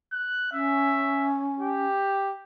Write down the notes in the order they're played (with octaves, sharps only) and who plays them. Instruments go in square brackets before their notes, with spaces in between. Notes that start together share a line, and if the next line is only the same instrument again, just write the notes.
[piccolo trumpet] F#6
[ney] C#4 [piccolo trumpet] E5
[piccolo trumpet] G4